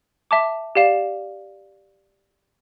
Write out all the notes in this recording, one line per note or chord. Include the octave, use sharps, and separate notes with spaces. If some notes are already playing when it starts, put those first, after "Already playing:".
E5 A5 D6
G4 D5 F5 E7